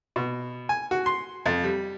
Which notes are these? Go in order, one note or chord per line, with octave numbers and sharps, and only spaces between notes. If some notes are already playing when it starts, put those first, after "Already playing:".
B2
G#5
F#4
C6
F2
G3